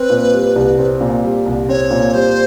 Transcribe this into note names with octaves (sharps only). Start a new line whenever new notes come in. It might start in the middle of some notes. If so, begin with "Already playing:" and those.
Already playing: C4 B4
A#2
G3
C2
C4
A#2
G3
C2
C4 C#5
A#2
G3 C5